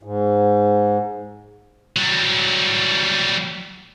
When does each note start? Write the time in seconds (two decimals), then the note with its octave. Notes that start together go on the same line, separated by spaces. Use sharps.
0.03 G#2
1.96 F#3 G3